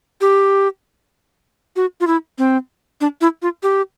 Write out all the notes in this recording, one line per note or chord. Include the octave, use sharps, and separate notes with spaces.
G4
F#4
F4
E4
C4
D4
E4
F4
G4